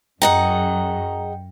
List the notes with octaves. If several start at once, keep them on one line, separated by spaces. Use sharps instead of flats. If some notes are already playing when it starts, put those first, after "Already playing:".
F#2 G#4 D#5 F#5 G5 A#5